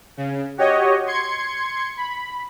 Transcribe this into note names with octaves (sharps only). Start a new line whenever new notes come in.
C#3
F#4 G4 C#5 D#5
C6 G#6 C#7
B5